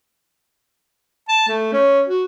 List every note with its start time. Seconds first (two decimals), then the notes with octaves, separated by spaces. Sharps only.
1.29 A5
1.48 A3
1.73 C#4
2.07 F#4